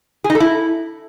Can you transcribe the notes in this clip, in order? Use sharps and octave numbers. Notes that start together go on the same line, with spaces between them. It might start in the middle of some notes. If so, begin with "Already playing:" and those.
G#4
D#4
A4
E4